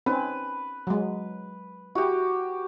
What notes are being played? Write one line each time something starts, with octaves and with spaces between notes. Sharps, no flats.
C4 C#4 D#4 B4
F#3 G#3
E4 F#4 G4